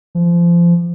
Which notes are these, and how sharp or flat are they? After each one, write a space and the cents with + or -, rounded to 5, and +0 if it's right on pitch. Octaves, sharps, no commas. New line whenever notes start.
F3 -25